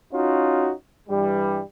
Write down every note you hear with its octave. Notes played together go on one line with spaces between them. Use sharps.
C#4 D#4 F4 F#4
G2 E3 G3